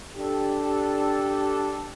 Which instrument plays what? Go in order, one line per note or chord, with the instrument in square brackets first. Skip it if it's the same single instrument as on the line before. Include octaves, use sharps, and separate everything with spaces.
[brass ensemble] D4 G4 A4